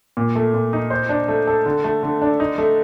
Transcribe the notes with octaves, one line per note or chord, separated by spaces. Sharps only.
A#2
A3
A#2
D#4
C5
D4
A3
A4
D3
A3
D3
D4
D#4
A3